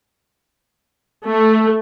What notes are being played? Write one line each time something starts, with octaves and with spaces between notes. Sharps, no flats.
A3